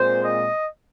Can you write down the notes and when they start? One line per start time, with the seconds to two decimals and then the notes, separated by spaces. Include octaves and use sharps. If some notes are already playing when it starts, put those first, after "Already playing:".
Already playing: A#2 G#3 C4 C5
0.24 D#5